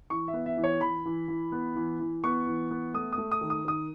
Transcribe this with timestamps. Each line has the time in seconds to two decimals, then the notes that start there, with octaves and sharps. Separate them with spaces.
0.10 E3 C#6
0.28 E5
0.33 B3
0.46 E5
0.57 E3
0.64 C#5
0.81 E3 B5
1.05 E3
1.28 E3
1.52 B3
1.76 E3
2.00 E3
2.24 B3 C#6
2.47 E3
2.71 B3
2.94 A3 D#6
3.12 D#6
3.18 A3
3.31 D#6
3.41 D#3
3.50 D#6
3.65 D#3 D#6